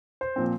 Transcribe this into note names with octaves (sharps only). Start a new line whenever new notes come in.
C5
A#2 F3 C4